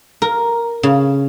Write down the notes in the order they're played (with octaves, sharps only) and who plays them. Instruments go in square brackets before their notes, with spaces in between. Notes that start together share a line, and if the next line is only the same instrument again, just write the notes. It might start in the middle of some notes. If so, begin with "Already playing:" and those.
[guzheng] A#4
C#3